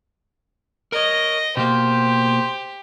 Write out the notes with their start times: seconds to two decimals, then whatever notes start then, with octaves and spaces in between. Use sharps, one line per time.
0.92 A#4 C#5 D#5
1.57 B2 A#3 G4 C5